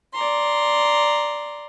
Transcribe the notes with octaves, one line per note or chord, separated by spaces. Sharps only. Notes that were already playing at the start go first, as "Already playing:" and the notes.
D5 A#5 C6